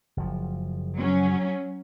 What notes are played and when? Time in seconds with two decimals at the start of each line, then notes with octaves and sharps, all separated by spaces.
0.17 F#1 F3
0.95 F#3 C#4